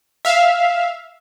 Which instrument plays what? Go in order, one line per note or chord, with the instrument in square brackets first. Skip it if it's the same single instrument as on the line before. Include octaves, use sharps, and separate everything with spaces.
[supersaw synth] E5 F5